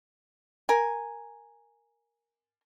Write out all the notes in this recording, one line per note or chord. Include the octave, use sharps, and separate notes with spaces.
A#4 G#5